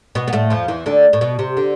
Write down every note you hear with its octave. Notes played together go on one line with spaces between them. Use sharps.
B2 B3
B3
A2 A3
F2 F3
E2 E3
D2 D3
A2
B2
C3
D3